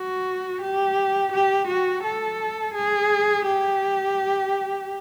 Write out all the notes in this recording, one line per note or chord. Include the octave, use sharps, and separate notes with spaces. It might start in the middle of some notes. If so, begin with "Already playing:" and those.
Already playing: F#4
G4
G4
F#4
A4
G#4
G4